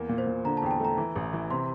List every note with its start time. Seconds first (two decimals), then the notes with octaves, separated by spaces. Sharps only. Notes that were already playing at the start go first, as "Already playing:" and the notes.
Already playing: E2 A#3
0.09 A#2
0.18 C5
0.27 A#2
0.45 D3 A#5
0.57 A5
0.62 E2 G5
0.71 A5
0.80 A3 A#5
0.98 E3
1.16 A1
1.33 E3
1.51 C3 C6